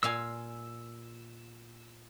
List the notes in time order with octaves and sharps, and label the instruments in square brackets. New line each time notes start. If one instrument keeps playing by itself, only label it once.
[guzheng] A#2 F5 G#5 [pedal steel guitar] E6